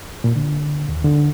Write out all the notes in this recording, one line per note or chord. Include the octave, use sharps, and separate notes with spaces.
A#2
D3
D#2
D3